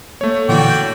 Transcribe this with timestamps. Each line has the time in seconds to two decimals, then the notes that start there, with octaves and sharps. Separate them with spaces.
0.21 A3 A#3 C#5
0.49 A#2 D3 E3 F#4 D5 G5